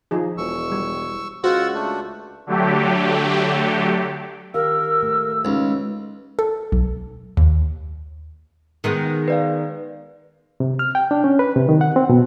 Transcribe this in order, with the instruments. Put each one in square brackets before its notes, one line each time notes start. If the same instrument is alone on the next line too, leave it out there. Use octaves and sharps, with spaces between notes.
[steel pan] F3 D#4 G#4
[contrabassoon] E1 [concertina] C#6 E6
[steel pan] G3
[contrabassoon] C#2 [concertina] F4 F#5 E6 [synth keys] F#4 [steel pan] C5
[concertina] A3 D4
[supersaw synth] D3 F#3 A3 G4
[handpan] D#3 G4 F5 [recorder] A#4 [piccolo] E6
[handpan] A3
[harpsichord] C#2 [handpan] D#4 B4
[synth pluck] A4
B1
D#2
[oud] D#3 G#3 B3
[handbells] B4 D5 F5
[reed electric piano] C3
F6
G5
D4
C#4
B4
C3
D#3
F#5
C4
B2